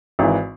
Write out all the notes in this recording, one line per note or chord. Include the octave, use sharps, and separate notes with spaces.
G#1 G#2 E3 E4